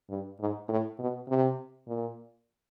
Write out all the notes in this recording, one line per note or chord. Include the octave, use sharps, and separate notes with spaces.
G2
G#2
A2
B2
C3
A#2